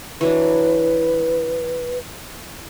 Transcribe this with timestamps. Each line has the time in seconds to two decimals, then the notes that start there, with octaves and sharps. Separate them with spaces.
0.21 E3 F#3 D4 B4